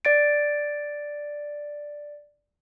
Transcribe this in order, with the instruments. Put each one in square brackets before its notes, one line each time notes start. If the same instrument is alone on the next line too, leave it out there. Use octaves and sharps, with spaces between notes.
[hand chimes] D5 A6 D7